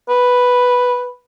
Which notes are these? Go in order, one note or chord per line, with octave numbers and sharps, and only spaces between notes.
B4